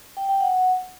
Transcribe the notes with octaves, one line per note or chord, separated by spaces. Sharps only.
G5
G5
F#5